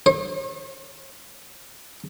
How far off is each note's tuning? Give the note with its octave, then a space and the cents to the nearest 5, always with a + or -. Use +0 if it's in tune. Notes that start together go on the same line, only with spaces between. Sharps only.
C#5 -45